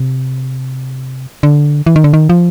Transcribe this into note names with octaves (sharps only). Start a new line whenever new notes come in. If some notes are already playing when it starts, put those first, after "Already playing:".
Already playing: C3
D3
E3
D#3
D3
D#3
F3